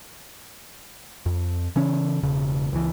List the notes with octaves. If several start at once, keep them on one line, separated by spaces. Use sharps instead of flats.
F2
C#3 E3 C#4
E1 C#3
C#2 E3